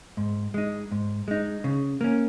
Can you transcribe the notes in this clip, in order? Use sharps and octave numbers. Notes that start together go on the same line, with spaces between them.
G#2
G#3 D#4
G#2
G#3 D#4
C#3
A#3 C#4